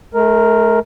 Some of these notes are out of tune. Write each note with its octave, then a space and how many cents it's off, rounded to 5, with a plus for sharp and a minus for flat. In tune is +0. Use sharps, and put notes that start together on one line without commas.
A3 -40 A#4 +0